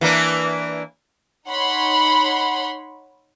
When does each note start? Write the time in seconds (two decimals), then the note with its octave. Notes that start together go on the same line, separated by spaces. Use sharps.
0.01 E3 A#3 D4
1.49 D#4 C#5 F#5 B5 C6